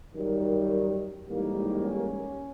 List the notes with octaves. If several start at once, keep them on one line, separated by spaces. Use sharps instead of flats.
F#2 D#3 G3
A1 G#2 D#3 G3 A#3
C#4